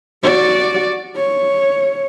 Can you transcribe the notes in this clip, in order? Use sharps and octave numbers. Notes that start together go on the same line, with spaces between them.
F#4 D5
C#5